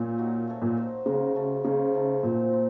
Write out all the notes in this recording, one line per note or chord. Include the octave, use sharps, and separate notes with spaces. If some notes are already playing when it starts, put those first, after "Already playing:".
Already playing: A#2 C#4 C#5
F#3 A#3 D#4 F#4
A3 C#4 A4 C#5
A#2
D#4 F#4 C5
C#3 C4 D#4 F#4 A#4
A3 D#4 F#4 A4
C#3 D#4 A4 C5
A3 D#4 A4
A#2 C4 F#4 C5
F4 A#4